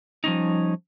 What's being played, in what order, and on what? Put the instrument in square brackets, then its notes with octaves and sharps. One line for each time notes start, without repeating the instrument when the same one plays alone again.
[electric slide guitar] F3 G3 C#4 D#4